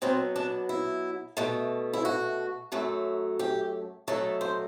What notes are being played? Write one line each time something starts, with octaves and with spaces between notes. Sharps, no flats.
B2 F#3 B3 C4
D4
E4
B2 A3
E4
F#4
F#2 F#3 A3
G4
B2 F#3 A3 A4
C5